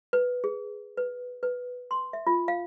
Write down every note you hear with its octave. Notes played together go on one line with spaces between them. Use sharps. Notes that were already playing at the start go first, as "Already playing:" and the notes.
B4
G#4
B4
B4
C6
E5
F4
F5